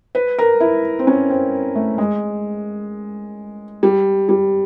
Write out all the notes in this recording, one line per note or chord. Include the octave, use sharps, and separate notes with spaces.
B4
A#4
E4
C4
C#4
C4
A3
G#3
G3
G3